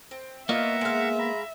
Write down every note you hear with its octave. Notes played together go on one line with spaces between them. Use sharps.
C4
A#3 B3 F4 C#5 D#5 E5 F#5 A#5
G#3 F5
A#5 B5